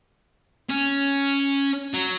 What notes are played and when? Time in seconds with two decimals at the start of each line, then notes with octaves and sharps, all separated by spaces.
0.70 C#4
1.94 F#3